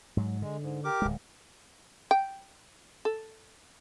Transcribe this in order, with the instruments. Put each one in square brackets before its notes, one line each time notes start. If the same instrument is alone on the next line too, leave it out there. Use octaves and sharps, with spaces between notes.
[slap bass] G#2 F#3
[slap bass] D3 [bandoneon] G#3
[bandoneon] G#2
G4 A#4 D6
[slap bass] D1 G#3
[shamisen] G5
A4